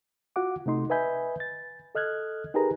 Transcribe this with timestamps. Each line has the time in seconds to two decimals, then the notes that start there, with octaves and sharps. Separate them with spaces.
0.36 F4 F#4 F#5 D6
0.66 C3 A3 D#4 C6
0.90 B4 D#5 E5 G#5 B5 G6
1.40 A6
1.95 A4 D#5 F6 F#6 G#6
2.54 D#4 G4 G#4 A#4 B4 A#5